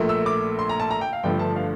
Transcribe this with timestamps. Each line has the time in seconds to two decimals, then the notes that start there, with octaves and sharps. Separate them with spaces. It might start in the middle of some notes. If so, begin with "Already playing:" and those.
Already playing: A#1 A#2 A3
0.09 E6
0.26 D6
0.59 C6
0.69 A#5
0.80 A5
0.91 A#5
1.01 G5
1.13 F5
1.23 G1 G2 D3 F3 A3 G5
1.39 A5
1.56 F5